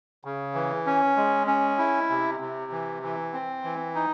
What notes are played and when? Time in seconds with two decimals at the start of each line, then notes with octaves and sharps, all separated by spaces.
0.25 C#3
0.54 E3
0.86 C#4
1.16 G#3
1.47 C#4
1.78 E4
2.10 C3
2.40 C3
2.72 E3
3.03 E3
3.33 C4
3.64 E3
3.95 D#4